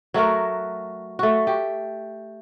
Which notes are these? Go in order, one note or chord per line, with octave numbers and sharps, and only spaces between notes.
F#3 A3 F#4 A#4
A3 F#4
G4